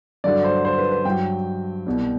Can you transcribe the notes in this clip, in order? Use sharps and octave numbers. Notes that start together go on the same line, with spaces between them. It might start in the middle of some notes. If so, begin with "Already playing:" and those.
G2 D3 F#3 D5
C5
C5
B4
B4
G2 F#3 G5
C2 B2 G3